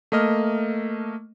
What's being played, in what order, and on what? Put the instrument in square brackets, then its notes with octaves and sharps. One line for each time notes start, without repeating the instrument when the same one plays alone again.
[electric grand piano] A3 A#3 D#5 F6